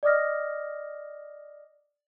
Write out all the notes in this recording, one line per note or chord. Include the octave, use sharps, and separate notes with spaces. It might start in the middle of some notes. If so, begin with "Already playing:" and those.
D5 D#5 D6 D#6 F6 A#6